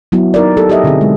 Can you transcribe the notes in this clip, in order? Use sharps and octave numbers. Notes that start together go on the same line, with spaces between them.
F#3 B3 E4 F#4
D#4 A#4 D5
G4 A4
G4 A4 D#5 E5
B2 D3 C4 E4 G#4
G#3